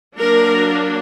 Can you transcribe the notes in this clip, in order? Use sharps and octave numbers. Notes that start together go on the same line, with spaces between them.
F#3 A#3 D4 A#4